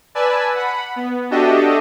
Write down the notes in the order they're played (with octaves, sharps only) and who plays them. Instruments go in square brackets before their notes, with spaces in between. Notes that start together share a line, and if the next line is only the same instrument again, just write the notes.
[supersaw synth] B4 D5 G#5 A5 E6
F#5 B5
B3
D4 F#4 G4 A4 D#5 E5